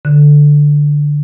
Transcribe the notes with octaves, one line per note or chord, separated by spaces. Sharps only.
D3